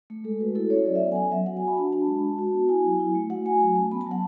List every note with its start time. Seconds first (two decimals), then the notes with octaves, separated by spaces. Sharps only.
0.10 A3
0.24 G#3 A4
0.40 F#4 B4
0.55 E4 A4
0.70 C#4 C#5
0.86 F#3 D5
0.95 E5
1.02 B3 F#5
1.12 G#5
1.16 C#4 F#5
1.32 F#3 E5
1.46 F#4 F#5
1.57 G#5
1.62 F#4
1.67 B5
1.77 D4 A5
1.92 D4 A5
2.08 G#3
2.23 F#4
2.38 F#4
2.54 B3
2.69 E4 G#5
2.85 F#3
3.00 E4
3.15 A3
3.30 F#4 F#5
3.45 A3 G#5
3.61 F#3 G#5
3.76 C#4 A5
3.91 B3 B5
4.01 A5
4.06 F#3 F#5